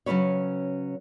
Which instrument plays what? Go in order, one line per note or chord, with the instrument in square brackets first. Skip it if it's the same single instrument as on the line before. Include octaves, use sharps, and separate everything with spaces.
[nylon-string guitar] C#3 F#3 A3 C#4 B4 C#5